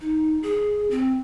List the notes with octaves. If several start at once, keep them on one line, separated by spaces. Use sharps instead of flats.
D#4
G#4
C4